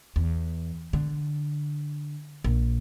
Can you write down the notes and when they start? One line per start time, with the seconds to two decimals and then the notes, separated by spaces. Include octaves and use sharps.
0.16 E2
0.93 D3
2.44 A#1